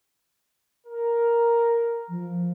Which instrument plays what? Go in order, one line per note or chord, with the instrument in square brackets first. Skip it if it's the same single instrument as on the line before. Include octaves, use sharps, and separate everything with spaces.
[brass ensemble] A#4
[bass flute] F3